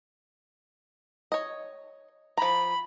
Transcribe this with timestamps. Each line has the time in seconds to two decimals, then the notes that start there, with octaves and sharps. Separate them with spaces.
1.32 C#5 D#5
2.37 F3 A#5 B5